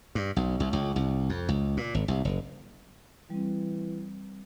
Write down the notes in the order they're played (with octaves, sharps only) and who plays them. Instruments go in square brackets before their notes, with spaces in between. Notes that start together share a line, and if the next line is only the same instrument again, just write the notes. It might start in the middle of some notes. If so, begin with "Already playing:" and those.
[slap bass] G2
B1
C2
C#2
C2
F2
C#2
A#2
G#1
C2
F#1
[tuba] E3 [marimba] G3 C4